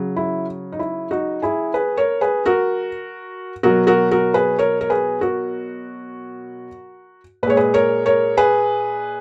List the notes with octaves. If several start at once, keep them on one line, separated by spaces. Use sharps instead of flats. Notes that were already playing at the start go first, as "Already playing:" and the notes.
Already playing: C#3 F#3
E4
D#4
E4
D#4 F#4
E4 G#4
G#4 B4
A#4 C#5
G#4 B4
F#4 A#4
B2 F#3 F#4 A#4
F#4 A#4
F#4 A#4
G#4 B4
A#4 C#5
A#4
G#4 B4
F#4 A#4
A#2 G#3 B4 C#5
G#4 B4
A#4 C#5
A#4 C#5
G#4 B4